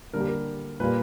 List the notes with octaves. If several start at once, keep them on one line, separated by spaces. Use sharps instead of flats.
D3 G3 A#3 A#4
G4
A#4
A#2 G3 A#3 B4